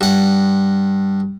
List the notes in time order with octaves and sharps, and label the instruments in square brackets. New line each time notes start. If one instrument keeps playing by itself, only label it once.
[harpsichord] G2 F#5